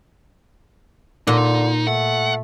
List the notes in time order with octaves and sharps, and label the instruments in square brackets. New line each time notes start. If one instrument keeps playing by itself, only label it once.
[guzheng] A#2 [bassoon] D3 [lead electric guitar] D#4
[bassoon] A3 [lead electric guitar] F#5